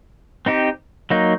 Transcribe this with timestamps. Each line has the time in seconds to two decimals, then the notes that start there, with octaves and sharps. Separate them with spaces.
0.46 C4 D#4 G4
1.10 F#3 A#3 D#4